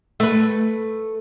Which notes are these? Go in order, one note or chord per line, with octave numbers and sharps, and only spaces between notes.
A3 B4